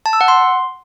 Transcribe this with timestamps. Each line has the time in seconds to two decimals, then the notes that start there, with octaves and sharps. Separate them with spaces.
0.06 A5
0.13 E6
0.21 F#5
0.28 C6